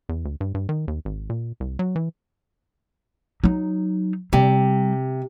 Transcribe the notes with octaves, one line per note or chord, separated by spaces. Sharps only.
E2
D2
G2
G2
D#3
D#2
G#1
A#2
C2
F#3
E3
F#3 D#4
C3 G3